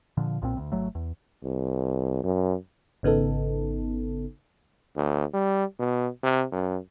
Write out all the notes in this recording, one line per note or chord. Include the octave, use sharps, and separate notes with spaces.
A#2 D3 F3
B1 A#2 D#3 C4
D2
G#1 F#3 A3
E2
C2
F#2
G#1 C#3 B3 D#4 A4
D2
G3
B2
C3
F#2